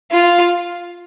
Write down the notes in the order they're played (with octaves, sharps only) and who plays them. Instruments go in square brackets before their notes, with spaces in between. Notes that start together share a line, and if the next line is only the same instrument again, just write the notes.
[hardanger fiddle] F4